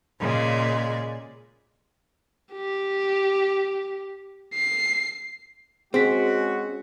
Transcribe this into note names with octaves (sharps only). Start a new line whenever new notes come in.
A#2 C#3 G#3 D5
G4
C7
G#3 C4 C#4 F#4 G#4 B6